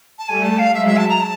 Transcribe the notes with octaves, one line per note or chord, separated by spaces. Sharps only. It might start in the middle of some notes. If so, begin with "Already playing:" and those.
A5
G3 A3 G#5
A5
F5
F#3 G#3 E5
E5
A5
A#5
A5